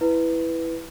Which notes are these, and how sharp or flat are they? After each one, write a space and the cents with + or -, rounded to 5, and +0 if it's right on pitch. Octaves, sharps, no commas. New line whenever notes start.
E4 +0 B4 +0